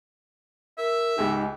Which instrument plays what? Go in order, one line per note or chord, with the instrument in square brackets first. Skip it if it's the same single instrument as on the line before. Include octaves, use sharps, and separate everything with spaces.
[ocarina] A#4 [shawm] E5
[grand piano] C#2 G#2 G4 [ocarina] D#4